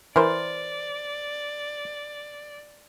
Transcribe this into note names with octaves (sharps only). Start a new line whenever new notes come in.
E3 A#4 C5 D5